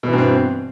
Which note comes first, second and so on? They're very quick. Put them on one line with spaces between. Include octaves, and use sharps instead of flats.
B2 E3 G2 C4